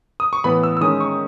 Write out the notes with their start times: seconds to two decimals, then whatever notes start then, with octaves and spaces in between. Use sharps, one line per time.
0.20 D#6
0.33 C#6
0.44 A2 E3 B3 B5
0.63 E6
0.77 E6
0.81 D#3 G#3 C#4 D#6
1.00 C#6